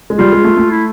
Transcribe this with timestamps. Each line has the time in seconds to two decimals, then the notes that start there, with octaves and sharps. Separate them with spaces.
0.10 G#3
0.18 G3 F4
0.32 G#3
0.44 A3
0.57 A3
0.71 E4